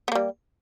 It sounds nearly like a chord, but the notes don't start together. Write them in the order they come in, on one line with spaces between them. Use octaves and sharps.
B3 A#3 G3